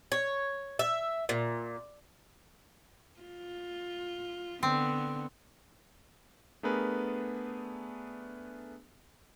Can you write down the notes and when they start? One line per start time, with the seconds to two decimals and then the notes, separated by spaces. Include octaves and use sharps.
0.12 C#5
0.79 E5
1.29 A#2
3.21 F4
4.63 D3 B3 C4
6.63 A3 B3 D4 G#4 A#4 B4